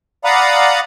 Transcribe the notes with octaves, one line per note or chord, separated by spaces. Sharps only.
D5 F5 F#5 A#5 B5 D#6